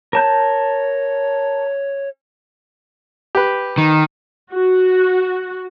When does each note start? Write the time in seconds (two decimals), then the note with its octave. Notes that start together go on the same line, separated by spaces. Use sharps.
0.13 A#4 C#5 A5 G6
3.35 G4 B4
3.78 D#3
4.54 F#4